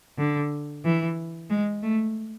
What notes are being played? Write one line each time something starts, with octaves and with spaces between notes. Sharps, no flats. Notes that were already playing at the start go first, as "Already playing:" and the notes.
D3
E3
G#3
A3